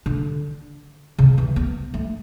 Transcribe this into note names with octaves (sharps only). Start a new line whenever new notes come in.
D3
C#3
E3
B3
A3